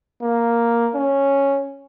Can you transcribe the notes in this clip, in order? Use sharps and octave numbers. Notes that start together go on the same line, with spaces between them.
A#3
C#4